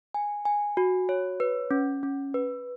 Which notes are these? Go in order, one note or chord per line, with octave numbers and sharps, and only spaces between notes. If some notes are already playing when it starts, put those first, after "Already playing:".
G#5
G#5
F#4
C#5
B4
C#4
C#4
B4